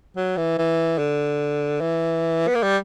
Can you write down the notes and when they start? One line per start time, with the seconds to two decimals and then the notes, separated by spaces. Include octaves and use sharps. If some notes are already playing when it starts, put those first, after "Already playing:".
0.17 F#3
0.37 E3
0.58 E3
0.98 D3
1.81 E3
2.47 B3
2.55 A#3
2.63 G3